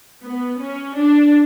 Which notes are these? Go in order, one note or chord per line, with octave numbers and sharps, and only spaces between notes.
B3
C#4
D4